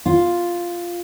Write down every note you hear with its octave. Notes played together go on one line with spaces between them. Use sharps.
F4